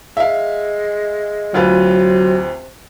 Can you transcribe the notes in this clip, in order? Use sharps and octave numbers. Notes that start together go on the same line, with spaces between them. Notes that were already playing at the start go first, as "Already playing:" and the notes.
G#3 E5 F5
D2 C3 F#3 F4 B4